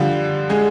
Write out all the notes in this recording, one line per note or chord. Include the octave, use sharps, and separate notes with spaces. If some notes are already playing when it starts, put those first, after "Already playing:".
Already playing: D3 F3 G3 F4
G#3 G#4